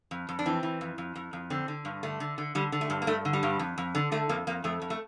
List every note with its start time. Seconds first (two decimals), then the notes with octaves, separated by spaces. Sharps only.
0.11 F2
0.29 F2
0.39 D4
0.46 E3 C4
0.63 E3
0.81 F2
0.98 F2
1.16 F2
1.33 F2
1.50 D3 C4
1.68 D3
1.85 G2
2.03 D3 A3
2.20 D3
2.38 D3
2.55 D3 G3
2.72 D3
2.81 A3
2.90 G2
3.02 A#3
3.07 G2 A3
3.25 D3
3.33 G3
3.43 G2
3.59 F2
3.78 F2
3.95 D3
4.12 D3 A3
4.29 F2 A#3
4.47 F2 A#3
4.64 F2 A3
4.82 F2
4.90 A3